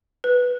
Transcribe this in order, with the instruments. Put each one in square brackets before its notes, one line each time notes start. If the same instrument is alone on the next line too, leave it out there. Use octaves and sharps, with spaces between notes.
[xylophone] B4